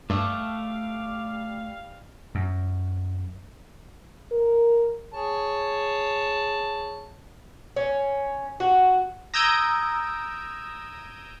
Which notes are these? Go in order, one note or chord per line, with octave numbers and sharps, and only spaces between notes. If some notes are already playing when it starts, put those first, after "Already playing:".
G2 G3 A3 E5 F5 D6
F#2
A#4
G#4 C#5 A5
C#4
F#4
A#5 D#6 E6 G6 G#6 D7